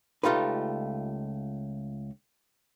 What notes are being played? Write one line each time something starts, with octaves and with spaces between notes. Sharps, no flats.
C#2 A3 D#4 F4 G4 B4